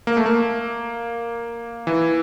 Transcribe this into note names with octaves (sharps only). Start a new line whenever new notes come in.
A#3
A3
A#3
E3